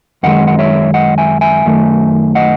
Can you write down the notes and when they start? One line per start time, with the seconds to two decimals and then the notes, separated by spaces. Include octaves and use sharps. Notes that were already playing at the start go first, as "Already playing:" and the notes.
0.23 F#2 D#3 G#3 D#5 F#5
0.47 F#5
0.59 C#5 E5
0.94 D#5 F#5
1.18 E5 G#5
1.41 E5 G#5
1.65 F#2 D#3 A3
2.35 D#5 F#5